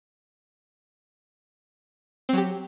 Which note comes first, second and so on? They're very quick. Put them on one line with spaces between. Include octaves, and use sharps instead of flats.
C4 F#3 G4